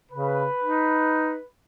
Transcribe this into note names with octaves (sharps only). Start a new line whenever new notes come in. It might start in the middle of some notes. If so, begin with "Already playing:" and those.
C#3 B4
D#4